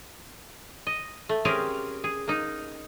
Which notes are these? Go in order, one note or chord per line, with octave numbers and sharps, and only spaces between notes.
D#5
A3
C4 C#4 G4 G#4 A#4
G#4
A#3 D#4